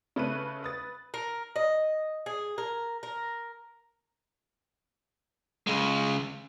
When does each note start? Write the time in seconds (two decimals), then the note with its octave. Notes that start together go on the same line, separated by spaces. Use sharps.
0.16 C#3 A3 B4 C#6 F#6 D#7
0.63 B4 D#6 A6
1.14 A#4
1.56 D#5
2.26 G#4
2.58 A#4
3.03 A#4
5.67 C#3 G#3